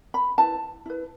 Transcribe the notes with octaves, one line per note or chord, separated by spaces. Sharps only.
B5
E4 B4 A5
E4 B4